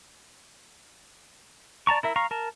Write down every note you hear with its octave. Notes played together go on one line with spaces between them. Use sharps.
D5 A5 A#5 C#6
E4 A#4 E5
F5 A#5 C#6
A#4 A5